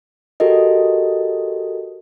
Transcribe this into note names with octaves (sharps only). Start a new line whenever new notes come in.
F#4 G4 A4 A#4 D#5